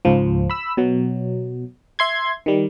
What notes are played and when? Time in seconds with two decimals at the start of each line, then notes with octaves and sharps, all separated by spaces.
0.05 C#2 G#2 F3
0.50 B5 E6
0.77 B2 F#3
1.99 E5 C6 G#6
2.46 D#3 G3